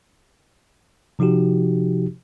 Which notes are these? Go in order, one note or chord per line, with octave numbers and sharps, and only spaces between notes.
C3 F3 D#4 F#4 G4